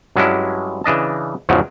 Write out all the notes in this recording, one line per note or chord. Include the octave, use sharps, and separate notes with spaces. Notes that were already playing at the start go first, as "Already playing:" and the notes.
G2 F#3 G#3 C#4 D4 E4
C#3 E3 D4 D#5 A5
E2 G#2 C#3 F3 F#3